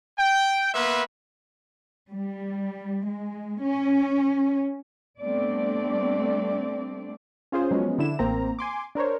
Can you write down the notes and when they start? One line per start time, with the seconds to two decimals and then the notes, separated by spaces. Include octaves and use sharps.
0.18 G5
0.74 A#3 B3 B4 E5 C6
2.11 G3
3.06 G#3
3.63 C#4
5.22 G3 A3 B3 C4 D4 D5
7.52 C#4 F4 G#4 C5
7.71 F3 F#3 G#3 B3 C#4
7.98 D3 D4 E4 E7
8.19 A1 A#3 C4 A#5
8.59 G#5 C6 D6
8.95 D4 A#4 C5 C#5